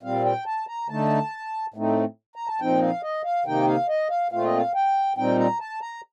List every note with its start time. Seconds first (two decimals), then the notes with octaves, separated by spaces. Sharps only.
0.03 A#2 G3 C4 F5
0.25 G5
0.46 A5
0.68 A#5
0.89 D3 A3 D#4 A5
1.74 A2 A3 C4 D#4
2.36 A#5
2.47 A5
2.60 A#2 F3 C4 D#4 G5
2.82 F5
3.03 D#5
3.24 F5
3.46 C3 D#3 A#3 D#4 G5
3.67 F5
3.89 D#5
4.10 F5
4.32 A#2 A3 C4 F4 F5
4.45 D#5
4.57 F5
4.75 G5
5.17 A#2 G3 C4 D#4 G5
5.39 A#5
5.60 A5
5.82 A#5